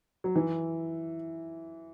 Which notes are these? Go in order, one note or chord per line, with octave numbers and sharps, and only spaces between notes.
F#3
E3